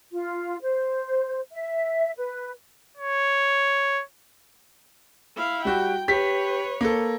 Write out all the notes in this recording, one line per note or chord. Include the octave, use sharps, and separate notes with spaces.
F4
C5
E5
B4
C#5
E4 F5
G3 F#4 G5
G4 B4 C#5 B6
A#3 A4